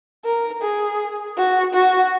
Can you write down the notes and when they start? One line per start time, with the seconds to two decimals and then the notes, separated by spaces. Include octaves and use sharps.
0.25 A#4
0.62 G#4
1.38 F#4
1.74 F#4